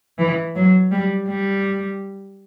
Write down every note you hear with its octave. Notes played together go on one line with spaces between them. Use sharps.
E3
F#3
G3
G3